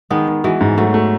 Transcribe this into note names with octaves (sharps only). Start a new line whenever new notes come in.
D#3 G#3 B3
D#3
E3 G#3 F#4
G#2
F#3 A3
A3